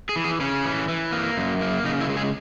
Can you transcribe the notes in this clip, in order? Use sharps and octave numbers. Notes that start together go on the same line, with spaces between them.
G#4
E3
G#4
C#3 C#4
E3
E3
A#3
F#2
A#3
C#3 D#4
E4
G#3
G#4